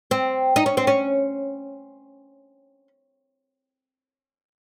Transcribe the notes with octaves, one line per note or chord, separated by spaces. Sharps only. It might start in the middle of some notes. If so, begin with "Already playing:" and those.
C4
D#4
C#4
C4
C#4